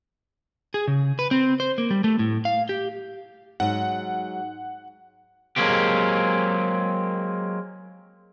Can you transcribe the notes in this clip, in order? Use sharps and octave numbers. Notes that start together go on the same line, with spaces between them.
G#4
C#3
B4
C4
C5
A#3
G3
A3
A2
F5
G4
G#2 F#3 F#5
F#3 G#3 A#3 C4 G4